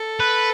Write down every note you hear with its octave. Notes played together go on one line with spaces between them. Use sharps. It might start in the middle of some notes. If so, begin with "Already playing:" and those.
Already playing: A4
B4